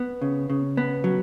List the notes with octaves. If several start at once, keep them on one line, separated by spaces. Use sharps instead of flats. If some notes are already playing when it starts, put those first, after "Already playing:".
Already playing: B3
C#3
C#3
B3
F#3